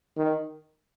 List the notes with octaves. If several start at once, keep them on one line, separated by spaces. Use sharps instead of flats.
D#3